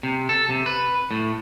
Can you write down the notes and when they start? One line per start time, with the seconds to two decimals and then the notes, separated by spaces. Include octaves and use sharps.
0.03 C3
0.29 A4
0.50 C3
0.66 B4
1.11 A2